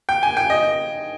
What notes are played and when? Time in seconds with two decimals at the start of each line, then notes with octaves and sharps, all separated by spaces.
0.09 G5
0.23 G#5
0.37 G5
0.50 D#5